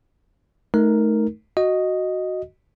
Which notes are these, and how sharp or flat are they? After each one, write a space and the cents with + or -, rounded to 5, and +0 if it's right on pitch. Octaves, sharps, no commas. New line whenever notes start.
A3 -20 D#4 +5 A#4 +0
F#4 +0 D#5 +0